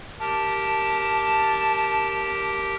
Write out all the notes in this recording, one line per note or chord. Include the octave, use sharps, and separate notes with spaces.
G4 A#4 A5